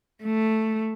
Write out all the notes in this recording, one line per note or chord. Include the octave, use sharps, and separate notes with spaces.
A3